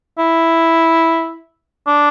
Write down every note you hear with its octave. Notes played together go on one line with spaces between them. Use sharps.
E4
D4